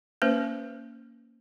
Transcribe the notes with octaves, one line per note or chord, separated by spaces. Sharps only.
A#3 C#4 B4 C5